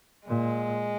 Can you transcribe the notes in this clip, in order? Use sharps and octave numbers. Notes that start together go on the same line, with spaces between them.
A#2 G#3